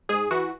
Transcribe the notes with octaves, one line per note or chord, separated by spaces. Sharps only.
G#2 G#4
E3 F#4